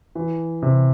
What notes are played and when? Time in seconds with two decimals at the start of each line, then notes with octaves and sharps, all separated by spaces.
0.15 E3
0.62 C3